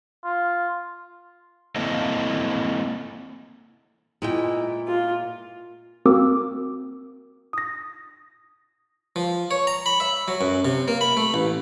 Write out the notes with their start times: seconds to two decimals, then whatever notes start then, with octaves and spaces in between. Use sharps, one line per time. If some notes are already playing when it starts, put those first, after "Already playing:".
0.25 F4
1.76 A#3 C4 E4 A4 D#5
4.22 A#2 G#3 B3 E4 G5
4.87 F4
6.06 A#3 C4 F#4 A#4 D6 E6
7.53 D#6 A#6
9.16 F3
9.51 C#5
9.67 A#5
9.86 B5
10.00 E5
10.28 F#3
10.41 F#2
10.65 C3
10.88 A#3
11.01 B5
11.17 A3
11.34 A1